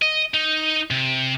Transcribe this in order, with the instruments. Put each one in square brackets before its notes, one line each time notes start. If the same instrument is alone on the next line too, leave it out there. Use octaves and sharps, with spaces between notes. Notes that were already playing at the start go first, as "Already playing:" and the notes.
[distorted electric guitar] D#5
D#4
C3